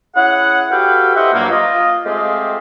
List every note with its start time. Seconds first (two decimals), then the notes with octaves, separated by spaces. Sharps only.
0.15 C#4 E4 G#4 F#5
0.71 F#4 G4 A4 B4 F5 G5
1.15 E4 G4 C5 D#5 E5 F#5
1.33 G2 F3 F#3 A#3
1.50 F4 D#5
2.05 G#3 A3 C4 F4 G4 G#4